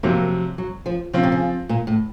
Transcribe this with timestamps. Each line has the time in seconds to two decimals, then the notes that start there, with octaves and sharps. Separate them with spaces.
0.03 F2 C3 F#3 A#3 C4
0.58 F#3
0.86 F3
1.13 C#3 F3 C4 F4
1.23 C3
1.32 C#3
1.69 A#2
1.87 A2